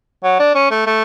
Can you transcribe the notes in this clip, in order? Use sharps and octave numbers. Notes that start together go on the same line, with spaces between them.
F#3
D4
C#4
A3
A3